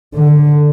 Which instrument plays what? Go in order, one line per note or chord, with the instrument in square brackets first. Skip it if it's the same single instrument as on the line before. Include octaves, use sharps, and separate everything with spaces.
[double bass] D3